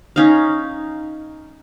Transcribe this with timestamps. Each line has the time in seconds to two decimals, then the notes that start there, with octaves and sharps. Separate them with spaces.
0.16 C#4 D#4 F5